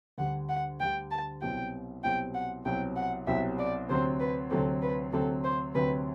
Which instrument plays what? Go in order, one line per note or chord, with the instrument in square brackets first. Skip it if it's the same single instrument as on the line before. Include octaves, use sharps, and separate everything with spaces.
[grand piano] D2 D3 G3 [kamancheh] F#5
[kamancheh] F#5
[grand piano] D2 D3 G3 [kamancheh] G5
[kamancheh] A5
[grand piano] C2 B2 F#3 C4 G4 [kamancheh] G5
[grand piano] C2 B2 F#3 C4 G4 [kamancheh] G5
[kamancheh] F#5
[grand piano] C2 B2 F#3 C4 G4 [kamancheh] G5
[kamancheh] F#5
[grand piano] C2 B2 F#3 C4 G4 [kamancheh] E5
[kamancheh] D5
[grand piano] D2 C3 F#3 C4 [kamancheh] C5
[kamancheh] B4
[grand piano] D2 C3 F#3 C4 [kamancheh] A4
[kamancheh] B4
[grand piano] D2 C3 F#3 C4 [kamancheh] A4
[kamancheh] C5
[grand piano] D2 C3 F#3 C4 [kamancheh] B4